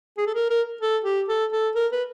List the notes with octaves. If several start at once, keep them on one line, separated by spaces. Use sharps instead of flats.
G#4
A4
A#4
A#4
A4
G4
A4
A4
A#4
B4